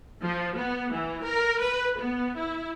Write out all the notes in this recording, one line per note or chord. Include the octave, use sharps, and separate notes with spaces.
F3
B3
E3
A#4
B4
B3
E4